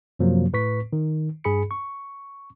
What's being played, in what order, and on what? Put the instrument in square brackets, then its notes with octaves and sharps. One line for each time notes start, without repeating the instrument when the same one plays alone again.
[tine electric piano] F#2 C3 F3 F#3 A#3
A2 B4 C#6 B6
D#3
G2 G#4 B5 C#7
C#6